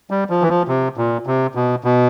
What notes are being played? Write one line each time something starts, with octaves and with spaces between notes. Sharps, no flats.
G3
F3
E3
F3
C3
A#2
C3
B2
B2